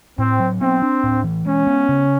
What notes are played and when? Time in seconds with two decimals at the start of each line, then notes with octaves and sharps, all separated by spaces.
0.18 A2 C4
0.40 F#3
0.61 B3 C4
0.82 D4
1.04 A2
1.24 E3
1.45 G#3 C#4
1.67 B3
1.89 C#3